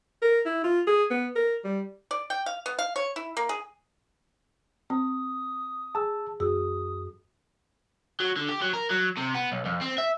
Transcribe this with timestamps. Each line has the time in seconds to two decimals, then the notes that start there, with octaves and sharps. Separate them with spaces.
0.22 A#4
0.46 E4
0.64 F4
0.87 G#4
1.11 B3
1.36 A#4
1.65 G3
2.11 D5
2.30 G5
2.46 F5
2.66 B3
2.79 F5
2.96 C#5
3.16 E4
3.37 A#3
3.49 G#4
4.90 C4 D#6
5.95 G#4 G#5 A5 E6
6.40 F#2 F#4 G#4 D#6 E6
8.20 F#3
8.36 D3
8.49 G4
8.62 F#3
8.74 A#4
8.91 F#3
9.18 C3
9.35 B3
9.52 B1
9.65 F2
9.81 C4
9.98 E5